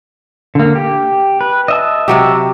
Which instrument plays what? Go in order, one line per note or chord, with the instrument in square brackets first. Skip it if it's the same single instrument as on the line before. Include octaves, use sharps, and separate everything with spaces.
[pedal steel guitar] D3 A#3
G4
B4
D#5 E5 A5
[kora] C3 F#3 G4